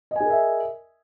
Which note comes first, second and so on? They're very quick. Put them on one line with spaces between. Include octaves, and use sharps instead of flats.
D#5 G#5 G#4 A#4 E5